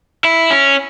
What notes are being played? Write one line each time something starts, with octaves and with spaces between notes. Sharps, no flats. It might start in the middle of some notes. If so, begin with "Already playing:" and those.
E4
C#4